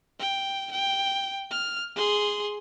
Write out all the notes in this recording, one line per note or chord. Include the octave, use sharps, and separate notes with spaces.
G5
G5
F6
G#4 C6